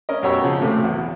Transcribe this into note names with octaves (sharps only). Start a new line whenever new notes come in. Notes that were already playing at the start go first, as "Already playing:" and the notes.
C#4 A#4 D#5
F#2 B2 G4 C#5 A#5 E6
C#3 F3
G#1 A2 C3 A3
B1 E2